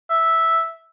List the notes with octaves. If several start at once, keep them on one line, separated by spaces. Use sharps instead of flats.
E5